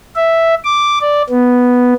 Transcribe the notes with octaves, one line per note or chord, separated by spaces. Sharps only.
E5
D6
D5
B3